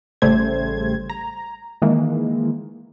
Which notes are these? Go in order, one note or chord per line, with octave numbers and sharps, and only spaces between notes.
A1 C#3 G3 A3 C5 G#6
A#5
D#3 E3 G#3 A#3